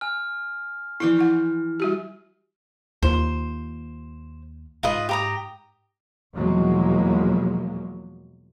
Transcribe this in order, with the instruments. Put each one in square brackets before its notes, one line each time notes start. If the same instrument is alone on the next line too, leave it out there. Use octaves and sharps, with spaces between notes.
[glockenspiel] G#5 F6
[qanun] E3 G5 C6 [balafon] F3 E4
[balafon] E4 F#5
G3 F#4 G4
[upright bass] D#2 F4 [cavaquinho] C5
[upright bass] G#2 [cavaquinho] F4 B4 D#5
[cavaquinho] G4 A#5 D#6
[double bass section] E2 B2 F3 F#3 G#3 A#3